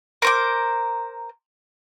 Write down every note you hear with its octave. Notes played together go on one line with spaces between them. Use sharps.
A#4 C5 D6